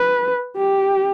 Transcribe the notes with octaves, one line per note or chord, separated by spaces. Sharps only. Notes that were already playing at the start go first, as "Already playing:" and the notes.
Already playing: B4
G4